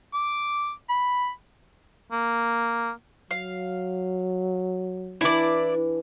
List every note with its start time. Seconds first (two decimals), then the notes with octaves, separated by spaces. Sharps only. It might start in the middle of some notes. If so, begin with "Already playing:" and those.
0.14 D6
0.89 B5
2.12 A#3
3.31 F#3 F5
5.21 E3 D4 E4 D5